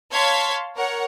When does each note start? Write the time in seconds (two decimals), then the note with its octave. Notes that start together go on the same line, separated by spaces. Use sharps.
0.12 C#5 F5 A5 C6 G#6 B6
0.77 A#4 C#5 F#5